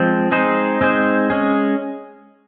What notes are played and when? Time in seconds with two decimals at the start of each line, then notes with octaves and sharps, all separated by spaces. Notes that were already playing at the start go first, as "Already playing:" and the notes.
Already playing: F3 G#3 C4
0.31 G#3 C4 D#4 G#4 C5
0.81 G#3 C4 D#4 G#4 C5
1.30 G#3 C#4 G#4